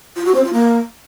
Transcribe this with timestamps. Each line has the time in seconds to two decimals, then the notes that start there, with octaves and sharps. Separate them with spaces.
0.16 F4
0.25 F#4
0.35 C4
0.44 F4
0.53 A#3